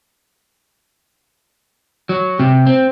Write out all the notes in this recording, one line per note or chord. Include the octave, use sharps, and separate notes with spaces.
F#3
C3
C4